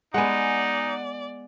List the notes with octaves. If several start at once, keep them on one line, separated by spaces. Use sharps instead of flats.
G#3 B3 D#4 D5 F#5 G#5